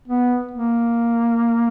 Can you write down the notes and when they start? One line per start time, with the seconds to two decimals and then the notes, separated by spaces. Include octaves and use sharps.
0.08 B3
0.51 A#3